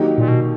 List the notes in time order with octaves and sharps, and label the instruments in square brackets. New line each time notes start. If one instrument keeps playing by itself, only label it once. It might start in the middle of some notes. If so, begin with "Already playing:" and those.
Already playing: [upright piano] D#3 F#3 A#3 D#4 G4
[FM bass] A#2
B2